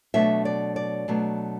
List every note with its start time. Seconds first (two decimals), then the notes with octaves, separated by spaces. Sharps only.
0.14 B2 F#3 A3 D4 E5
0.45 D5
0.76 D5
1.08 B2 F#3 A3 D4